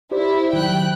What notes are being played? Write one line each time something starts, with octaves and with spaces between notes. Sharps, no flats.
E4 G4 C5 D5
D#3 F#3 G5 F#6